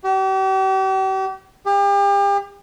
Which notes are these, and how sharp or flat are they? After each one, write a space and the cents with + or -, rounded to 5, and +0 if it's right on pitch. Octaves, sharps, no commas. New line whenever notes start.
G4 -40
G4 +40